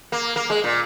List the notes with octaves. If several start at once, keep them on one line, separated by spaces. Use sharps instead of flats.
A#3
A#3
G#3
A#2